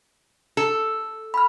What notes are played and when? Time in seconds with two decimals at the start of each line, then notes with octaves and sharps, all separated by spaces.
0.57 A4
1.34 B5 F6